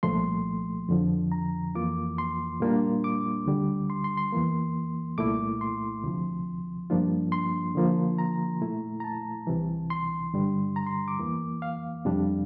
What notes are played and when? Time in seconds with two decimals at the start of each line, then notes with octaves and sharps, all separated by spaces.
0.03 C2 A#2 F3 A3 C6
0.89 F2 D3 F3
1.32 A#5
1.75 F2 E3 A#3 F4 D6
2.18 C6
2.60 A#2 G3 A#3 D4 F4
3.04 D6
3.46 D2 D3 G3
3.90 C6
4.04 C6
4.17 C6
4.33 E2 E3 A#3
5.18 C2 A#2 A3 E4 D6
5.61 C6
6.04 D2 C3 F3
6.90 G2 F3 A#3 D4 F4
7.32 C6
7.75 D3 F3 A#3 F4
8.18 A#5
8.61 A#2 A3 E4
9.00 A#5
9.04 A5
9.47 C2 C3 E3
9.90 C6
10.34 G2 D3 G3
10.76 A#5
10.87 C6
11.08 D6
11.19 E2 E3 A#3
11.62 F5
12.05 F2 C3 G3 D4